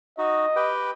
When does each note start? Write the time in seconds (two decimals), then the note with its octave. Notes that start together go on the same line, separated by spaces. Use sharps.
0.18 D#4 F#4 D#5
0.56 G4 B4 G5